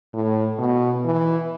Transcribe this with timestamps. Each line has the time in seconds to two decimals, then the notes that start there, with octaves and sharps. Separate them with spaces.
0.14 A2
0.59 B2
1.05 E3